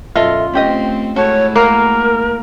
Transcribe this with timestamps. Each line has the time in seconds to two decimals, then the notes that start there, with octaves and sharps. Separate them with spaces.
0.16 F#2 B2 F4 A4 D#5 E5
0.53 A3 C4 C#4 G4 D#5
1.16 G#3 A3 E4 F#4 A4 C#5
1.56 A#3 F#4 A#4